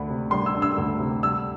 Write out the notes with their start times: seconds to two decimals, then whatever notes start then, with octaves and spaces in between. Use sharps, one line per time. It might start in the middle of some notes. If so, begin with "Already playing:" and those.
Already playing: D2 D4 B5
0.09 C3
0.31 G3 C6
0.46 E6
0.55 D4
0.62 E6
0.78 D2
1.00 C3
1.23 G3 E6